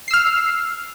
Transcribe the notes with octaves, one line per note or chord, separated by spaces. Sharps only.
E6 F6 C7